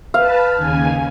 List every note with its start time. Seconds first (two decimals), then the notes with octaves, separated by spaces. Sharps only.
0.14 B4 F5 A5
0.55 D#2 C#3 G#5